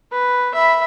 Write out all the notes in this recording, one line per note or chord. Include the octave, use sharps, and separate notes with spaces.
B4
E5 B5